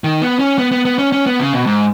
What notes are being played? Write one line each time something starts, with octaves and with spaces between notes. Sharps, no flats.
D#3
B3
C#4
B3
B3
B3
C#4
C#4
B3
C#3
B2
G#2